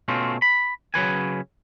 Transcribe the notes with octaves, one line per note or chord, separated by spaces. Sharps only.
B2 A3 C4 C#4 F4
B5
C#3 F#3 B4 G#5